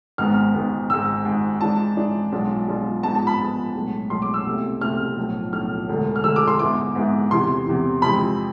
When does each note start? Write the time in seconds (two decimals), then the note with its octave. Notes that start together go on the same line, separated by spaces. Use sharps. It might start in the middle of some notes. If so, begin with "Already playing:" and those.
0.18 G#1 G#2 G#3 B3 F6
0.54 G#1 G#2 G#3 B3
0.90 G#1 G#2 G#3 E6
1.25 G#1 G#2 G#3
1.61 G#2 E3 G#3 D4 A5
1.97 G#2 E3 G#3 D4
2.32 B1 B2 G#3 D4 F4
2.68 B1 B2 G#3 D4 F4
3.03 G#2 F3 G#3 B3 A5
3.15 A5
3.27 B5
3.39 G#2 F3 G#3 B3
3.75 B1 A2 G#3
4.10 B1 A2 G#3 C6
4.22 D6
4.34 E6
4.46 C2 B2 A3 C4
4.81 C2 B2 A3 C4 F6
5.17 B1 A2 F3
5.53 B1 A2 F3 F6
5.88 E1 D2 D3 G#3
6.16 F6
6.24 E1 D2 D3 G#3 E6
6.36 D6
6.48 C6
6.59 G#2 G#3 B3 E4 D6
6.95 G#2 G#3 B3 E4
7.31 E2 C3 E3 C6
7.66 E2 C3 E3
8.02 F2 C3 G#3 C4 B5